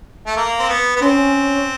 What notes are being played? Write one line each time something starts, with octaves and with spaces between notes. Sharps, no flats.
A3
A#3
C4
B3
B3
C4 C#4